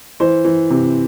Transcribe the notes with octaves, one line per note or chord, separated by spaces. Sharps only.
E3 C5
E3
C3